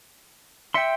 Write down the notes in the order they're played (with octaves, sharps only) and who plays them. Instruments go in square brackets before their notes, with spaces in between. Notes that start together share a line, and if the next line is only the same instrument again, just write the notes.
[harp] E5 B6 C#7 [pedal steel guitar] G5 C6